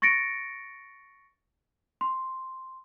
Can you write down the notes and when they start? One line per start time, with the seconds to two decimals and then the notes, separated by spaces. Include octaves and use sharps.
0.02 C#6 A6 A#6 C#7 D7
2.01 C6